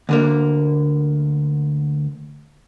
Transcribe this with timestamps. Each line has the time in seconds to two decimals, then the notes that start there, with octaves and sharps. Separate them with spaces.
0.09 D2 D3 A#3